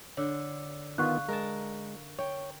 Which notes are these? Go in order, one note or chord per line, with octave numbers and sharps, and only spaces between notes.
D3 C#5
D#3 B3 F4 F5 C#6 F#6
G#3 A#4 A5
C#5 G5